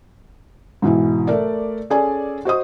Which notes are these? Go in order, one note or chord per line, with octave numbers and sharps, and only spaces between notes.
G#2 B2 E3 E4
A3 A#4 D5
C#4 G#4 A4 D5 G#5
F#4 C5 D#5 D#6